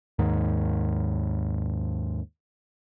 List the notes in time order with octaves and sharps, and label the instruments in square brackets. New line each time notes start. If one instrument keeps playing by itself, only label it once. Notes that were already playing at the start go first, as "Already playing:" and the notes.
[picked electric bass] D#2 G#2 D#3